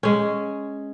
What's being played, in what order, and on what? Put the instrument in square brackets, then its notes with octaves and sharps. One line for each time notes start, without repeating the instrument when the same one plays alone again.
[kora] G#3 C#4